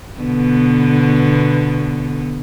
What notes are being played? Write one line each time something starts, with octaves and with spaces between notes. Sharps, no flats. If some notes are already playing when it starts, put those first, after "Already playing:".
B2 D3 B3